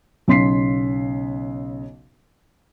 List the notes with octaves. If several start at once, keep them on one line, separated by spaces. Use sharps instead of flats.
B1 C#3 C6 B6 C7